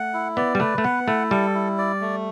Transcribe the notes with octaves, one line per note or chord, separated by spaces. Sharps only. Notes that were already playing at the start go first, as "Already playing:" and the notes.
Already playing: A3 F#5
E4
B3 D5
G3
A3 B4
A3
B3 F#5
A3 E4
G3 A4
E4
D5
A3